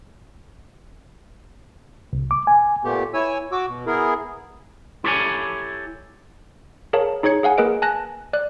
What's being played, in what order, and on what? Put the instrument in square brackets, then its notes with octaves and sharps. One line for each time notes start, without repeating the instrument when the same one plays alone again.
[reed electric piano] C2
D6
G#5
[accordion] A#2 A3 B3 G4
E4 C#5 G#5 E6
F#4 D6 E6
B2
B3 E4 G#4 A#4
[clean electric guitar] E4 G4 A4 C#5 G#5
[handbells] G#4 A#4 C#5 F5 A5
D#4 G#4 C#5 G#6 C#7
G#4 F5 F#5 G#5
A#3 G#4 A#4 B4 D#5 D7
G#5 A5 F#6 A#6
D5 F#6